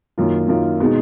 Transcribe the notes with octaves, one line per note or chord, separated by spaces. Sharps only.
F#2 D#3 A#3 F4
F#2 D#3 A#3 F4
B2 G#3 D#4